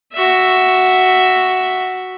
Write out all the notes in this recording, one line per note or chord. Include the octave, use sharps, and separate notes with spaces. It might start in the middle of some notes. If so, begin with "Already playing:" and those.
F#4 E5